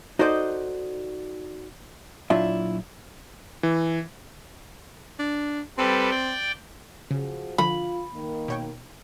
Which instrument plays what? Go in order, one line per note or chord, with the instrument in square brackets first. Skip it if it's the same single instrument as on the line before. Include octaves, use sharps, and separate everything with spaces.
[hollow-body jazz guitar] D#4 F#4 A4 C5 D5 D#5
A#2 F#3 D4 E4 F4 E5
[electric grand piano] E3
[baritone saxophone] D4
[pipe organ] G3 A4 B4 [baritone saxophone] C4
[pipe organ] D5 G5
[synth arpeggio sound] C#3 [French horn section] F3 F#4 G#4
[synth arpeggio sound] D3 F3 [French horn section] F4 [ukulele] B5
[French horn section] D#3 A#3
[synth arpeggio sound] B2 C#5 G5